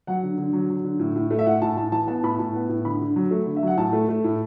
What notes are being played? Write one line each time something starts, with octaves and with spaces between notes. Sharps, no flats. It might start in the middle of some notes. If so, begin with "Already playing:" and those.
F#3 F#5
D3
D3
F#3
F#3
D3
A2
A2
A3
E5
A2 F#5
A2 A5
A2 A5
E3 A5
B3 A5
A2 B5
A2 A5
B3
A2
D3 B5
D3
F#3
A3
D3
E5
F#3 F#5
A2 A5
A3
A3
A2